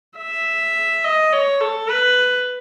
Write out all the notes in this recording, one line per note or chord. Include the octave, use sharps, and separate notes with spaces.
E5
D#5
C#5
A4
B4